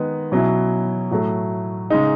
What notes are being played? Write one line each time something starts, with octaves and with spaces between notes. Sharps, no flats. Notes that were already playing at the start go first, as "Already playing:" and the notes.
Already playing: D#3 G#3 B3 D#4
B2 F#3 C#4 E4
A2 F#3 A3
C#3 G#3 D#4